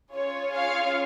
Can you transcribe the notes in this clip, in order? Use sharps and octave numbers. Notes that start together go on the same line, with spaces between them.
C#4 F4 G#4 C#5
C#5 F5